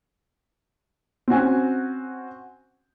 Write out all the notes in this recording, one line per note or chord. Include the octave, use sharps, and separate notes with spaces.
C4 C#4 F#4 G#5